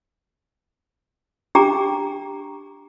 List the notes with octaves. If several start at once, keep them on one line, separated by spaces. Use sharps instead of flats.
D4 G4 G5 A#5 D6